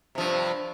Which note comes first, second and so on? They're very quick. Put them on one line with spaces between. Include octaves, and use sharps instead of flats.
C3 F3 G2